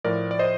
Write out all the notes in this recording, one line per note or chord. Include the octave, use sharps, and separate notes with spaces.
A2 F3 A#4 D5
D5
C5 D#5